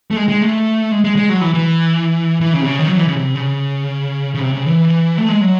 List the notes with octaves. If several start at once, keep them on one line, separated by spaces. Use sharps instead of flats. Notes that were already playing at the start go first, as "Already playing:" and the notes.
A3
G#3
G#3
A3
G#3
G#3
G#3
F#3
E3
E3
E3
C#3
C3
C#3
D#3
F#3
E3
C#3
C3
C#3
C#3
C3
C#3
E3
A3
G#3
F#3